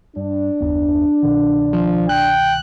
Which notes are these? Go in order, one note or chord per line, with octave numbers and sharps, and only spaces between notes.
G2 D4
F#1 D#2 B3
C2 B2 D#3
F3
G5 F#6